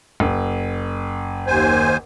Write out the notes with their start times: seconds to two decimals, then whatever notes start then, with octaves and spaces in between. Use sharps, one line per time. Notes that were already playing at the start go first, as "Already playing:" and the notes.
0.20 F#1
1.47 D#2 C5 G#5